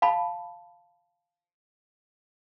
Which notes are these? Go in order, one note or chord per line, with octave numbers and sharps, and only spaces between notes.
F5 A5 B5